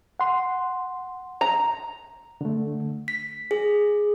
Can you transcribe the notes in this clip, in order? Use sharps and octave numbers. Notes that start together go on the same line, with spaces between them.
F#5 C6
A#5
D3 A3
B6
G#4